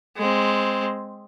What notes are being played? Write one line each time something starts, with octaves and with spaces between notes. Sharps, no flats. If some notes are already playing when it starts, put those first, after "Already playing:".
G#3 C4